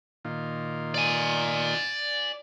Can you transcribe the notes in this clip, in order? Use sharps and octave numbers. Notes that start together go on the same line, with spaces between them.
A#2 D#3 F4
D5 G#5